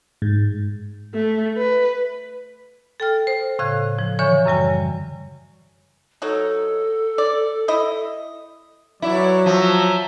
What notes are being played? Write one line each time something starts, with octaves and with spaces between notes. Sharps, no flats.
G#2
A3
B4
A4 G5 F6
C5
A2 C#3 F5 F#6 G#6
F3
D3 E3 C#5 G#5 C#6
F#2 C#3 G3 G#5
F#3 D#4 A4
D5
E4 D#5
F#3 E4 B4 C#5 D5
F3 C#5 E5 A#5